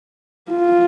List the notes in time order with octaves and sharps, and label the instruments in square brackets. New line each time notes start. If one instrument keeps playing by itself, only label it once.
[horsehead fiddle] F4